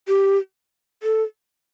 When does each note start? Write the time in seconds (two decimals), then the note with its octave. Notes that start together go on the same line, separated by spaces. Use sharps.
0.08 G4
1.03 A4